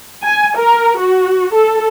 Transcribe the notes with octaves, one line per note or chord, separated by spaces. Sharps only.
G#5
A#4
F#4
A4